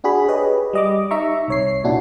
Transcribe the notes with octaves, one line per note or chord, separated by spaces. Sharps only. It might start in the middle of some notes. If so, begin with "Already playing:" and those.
D4 F#4 G#4 B5
G4 G#4 B4 C#5 D#5
G3 D#5 D6
D#4 E5 A#5 C#6
C2 C#5 C7
A#2 C#4 D4 E4 F#4